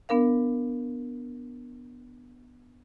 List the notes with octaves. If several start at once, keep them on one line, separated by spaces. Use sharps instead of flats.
B3 D4 A#4 F5